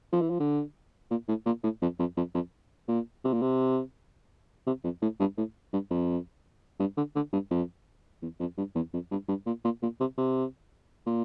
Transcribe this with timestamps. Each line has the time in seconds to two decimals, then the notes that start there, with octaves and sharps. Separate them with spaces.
0.13 F3
0.21 E3
0.30 F3
0.40 D3
1.10 A#2
1.28 A2
1.46 A#2
1.63 A2
1.82 F2
1.99 F2
2.17 F2
2.35 F2
2.88 A#2
3.25 C3
3.33 A#2
3.42 C3
4.66 C3
4.84 F2
5.02 A2
5.20 G2
5.38 A2
5.73 G2
5.91 F2
6.80 G2
6.97 D3
7.15 D3
7.33 G2
7.51 F2
8.22 E2
8.40 F2
8.57 G2
8.75 E2
8.93 F2
9.11 G2
9.28 G2
9.46 A#2
9.64 A#2
9.82 A#2
10.00 C3
10.18 C3
11.07 A#2